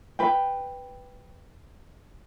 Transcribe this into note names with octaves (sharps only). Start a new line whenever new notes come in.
B4 G5